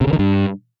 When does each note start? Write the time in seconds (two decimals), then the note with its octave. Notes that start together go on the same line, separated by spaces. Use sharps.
0.01 C3
0.07 C#3
0.13 D#3
0.19 G2